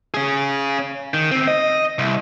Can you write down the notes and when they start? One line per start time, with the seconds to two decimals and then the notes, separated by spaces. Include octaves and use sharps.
0.14 C#4 G#4
1.14 D#3
1.31 D2 C4
1.47 D#5
1.98 C2